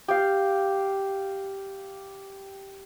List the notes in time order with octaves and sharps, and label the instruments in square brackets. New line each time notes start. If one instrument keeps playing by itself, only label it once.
[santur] G4 F5